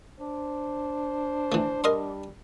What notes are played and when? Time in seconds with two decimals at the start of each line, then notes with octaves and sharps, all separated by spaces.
0.20 D4 C5
1.52 E3 A3
1.84 G3 A#4 D#5 C6